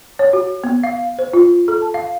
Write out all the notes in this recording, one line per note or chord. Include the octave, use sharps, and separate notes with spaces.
C#5
F#4
B3
F5
C5
F4
A4
A5
F5